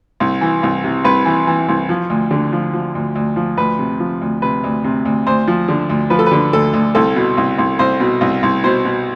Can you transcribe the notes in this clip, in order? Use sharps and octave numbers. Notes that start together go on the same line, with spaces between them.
C2
E3
C2
C3
C2 B4
E3
E3
C2
F3
D2
D3
F3
F3
D2
D2
F3
D2 B4
C3
F3
D2
C3 B4
D2
C3
D2
D2 C5
F3
D3
D2
F3 B4
A4
B4
D3
D2 A4
D2
C2 A4
B2
C2
C2
C2 C5
B2
C2
C2
B2 C5
B2